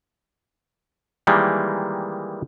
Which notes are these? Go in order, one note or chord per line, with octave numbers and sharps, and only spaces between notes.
D#3 E3 G3 G#3 A#3